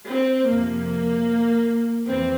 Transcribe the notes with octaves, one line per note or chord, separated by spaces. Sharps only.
C4
F2 C3 F3 A#3
F2 C3 E3 C4